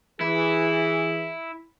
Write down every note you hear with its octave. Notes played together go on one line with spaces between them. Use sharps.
E3 E4 G#4